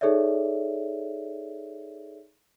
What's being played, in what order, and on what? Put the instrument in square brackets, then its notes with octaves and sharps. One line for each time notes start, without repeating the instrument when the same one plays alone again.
[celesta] D#4 G#4 A4 C#5 D5 E5